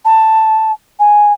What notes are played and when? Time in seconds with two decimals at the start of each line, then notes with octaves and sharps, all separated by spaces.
0.05 A5
0.99 G#5